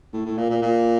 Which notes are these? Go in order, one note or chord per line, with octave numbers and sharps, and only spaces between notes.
A2
A2
A#2
A#2
A#2